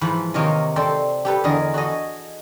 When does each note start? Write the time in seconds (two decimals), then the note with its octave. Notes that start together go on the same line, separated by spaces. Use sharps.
0.01 G#2 E3 F3 B5
0.34 C3 D#3 A#3 A#4 C#5 D#5
0.76 C4 A4 C5 D5
1.25 G4 A4 B4
1.44 E2 D3 G#4 A#4 D#5
1.74 F#4 G#4 A4 D#5